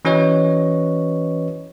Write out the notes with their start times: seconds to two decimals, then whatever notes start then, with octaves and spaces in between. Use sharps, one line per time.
0.05 E3 C#4 F#4 B4 C#5 D#5